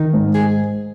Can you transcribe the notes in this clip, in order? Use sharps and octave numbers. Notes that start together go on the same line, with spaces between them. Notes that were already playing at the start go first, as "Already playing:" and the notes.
Already playing: D#3 D#4
G#2
G#4